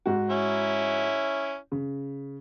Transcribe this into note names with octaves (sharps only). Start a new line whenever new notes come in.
G#2 F#4
C#4 E4
C#3